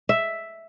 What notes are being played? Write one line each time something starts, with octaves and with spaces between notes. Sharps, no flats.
E5